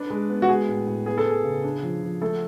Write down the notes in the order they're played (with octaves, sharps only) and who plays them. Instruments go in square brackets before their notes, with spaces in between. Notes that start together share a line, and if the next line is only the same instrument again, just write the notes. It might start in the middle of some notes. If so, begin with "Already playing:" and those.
Already playing: [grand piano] D4 B4
G#3
B3
F#4
G#3 G#4
A2
A2
B3 G#4
A4
B3 G#4
C#3
D4
F3
F3
A3 A4